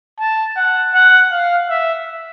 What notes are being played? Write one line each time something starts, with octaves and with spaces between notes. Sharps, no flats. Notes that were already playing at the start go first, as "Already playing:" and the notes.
A5
F#5
F#5
F5
E5